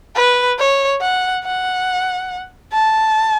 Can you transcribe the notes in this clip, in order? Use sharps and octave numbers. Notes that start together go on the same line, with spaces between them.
B4
C#5
F#5
F#5
A5